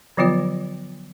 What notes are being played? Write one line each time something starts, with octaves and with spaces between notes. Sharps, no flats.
D3 F3 F#3 B3 F4 C#5